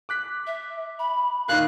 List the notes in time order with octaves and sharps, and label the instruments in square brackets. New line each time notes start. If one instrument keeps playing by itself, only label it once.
[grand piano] D6 F#6 B6
[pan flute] E5
B5
[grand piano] A#2 D#3 [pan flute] F5 [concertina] F#6